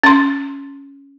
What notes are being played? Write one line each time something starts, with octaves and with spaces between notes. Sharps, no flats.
C#4 C6